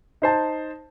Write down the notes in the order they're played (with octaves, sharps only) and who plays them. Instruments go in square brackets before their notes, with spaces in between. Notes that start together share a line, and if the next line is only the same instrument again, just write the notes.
[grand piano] D#4 C5 A5